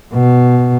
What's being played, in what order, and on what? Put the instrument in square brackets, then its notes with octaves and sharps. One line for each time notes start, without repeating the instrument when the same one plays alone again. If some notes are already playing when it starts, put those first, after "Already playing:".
[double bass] B2